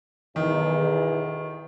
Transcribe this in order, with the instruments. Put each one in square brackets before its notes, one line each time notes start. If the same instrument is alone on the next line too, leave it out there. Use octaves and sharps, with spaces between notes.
[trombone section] B1 E2 [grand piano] D#3